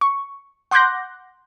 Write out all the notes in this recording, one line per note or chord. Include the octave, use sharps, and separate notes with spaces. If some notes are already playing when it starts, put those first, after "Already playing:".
C#6
F#5 C6 D6 F#6 G6 A#6